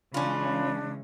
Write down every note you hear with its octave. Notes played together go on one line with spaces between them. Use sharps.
C#3 E3 G#3 C#4 D4 F4 B5